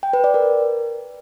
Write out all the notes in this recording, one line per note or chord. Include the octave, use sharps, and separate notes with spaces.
G5
B4
D5
A#4